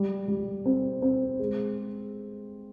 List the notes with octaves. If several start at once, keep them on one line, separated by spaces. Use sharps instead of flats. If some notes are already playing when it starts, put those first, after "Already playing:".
Already playing: G3
G3
C4
C4
G#3